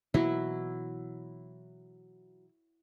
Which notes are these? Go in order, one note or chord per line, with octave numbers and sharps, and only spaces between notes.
B2 E3 F#3 A#3 E4